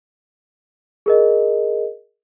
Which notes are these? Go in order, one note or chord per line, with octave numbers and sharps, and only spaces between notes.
G#4 A#4 D#5